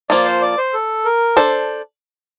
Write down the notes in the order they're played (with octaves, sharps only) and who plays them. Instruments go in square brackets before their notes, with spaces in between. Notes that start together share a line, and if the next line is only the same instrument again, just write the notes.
[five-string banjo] F3 A#3 F4 [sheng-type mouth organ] D5
[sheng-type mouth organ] C5
D5
C5
A4
A#4
[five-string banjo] D4 A4 C5